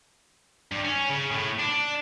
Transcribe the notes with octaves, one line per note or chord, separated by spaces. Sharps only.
G2
C#4
C#3
A2
D4